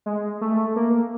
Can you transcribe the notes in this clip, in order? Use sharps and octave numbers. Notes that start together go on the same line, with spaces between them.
G#3
A3
A#3